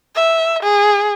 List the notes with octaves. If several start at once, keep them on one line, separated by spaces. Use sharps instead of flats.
E5
G#4